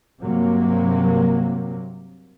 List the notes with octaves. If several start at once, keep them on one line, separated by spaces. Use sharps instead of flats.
G2 C3 F#3 A#3